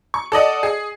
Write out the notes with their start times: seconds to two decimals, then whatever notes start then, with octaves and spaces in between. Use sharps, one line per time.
0.14 C#6
0.32 A4 D5 D#5 F#5
0.63 G#4